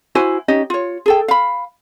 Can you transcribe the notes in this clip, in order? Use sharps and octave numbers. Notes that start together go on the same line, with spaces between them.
E4 F#4 C5 G#5
C#4 D#4 G4 D#5
F4 C#5
G#4 A4 G5
F5 B5